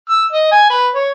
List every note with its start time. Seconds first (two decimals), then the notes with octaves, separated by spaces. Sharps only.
0.10 E6
0.32 D#5
0.52 G#5
0.70 B4
0.95 C#5